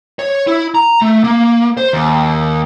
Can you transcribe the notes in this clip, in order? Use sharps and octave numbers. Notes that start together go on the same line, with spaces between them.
C#5
E4
A#5
A3
A#3
C5
D#2